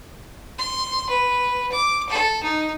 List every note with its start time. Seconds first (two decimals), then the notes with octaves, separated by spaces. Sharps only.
0.58 C6
1.09 B4
1.72 D6
2.09 A4
2.43 D#4